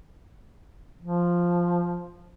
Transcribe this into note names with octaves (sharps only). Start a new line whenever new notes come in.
F3